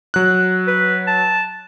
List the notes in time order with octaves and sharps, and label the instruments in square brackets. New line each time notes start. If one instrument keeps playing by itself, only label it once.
[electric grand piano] F#3 F#6
[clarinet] B4
A5